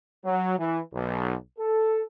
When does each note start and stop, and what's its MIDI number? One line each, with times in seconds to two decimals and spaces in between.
0.25 0.55 54
0.59 0.80 52
0.94 1.34 35
1.59 2.02 69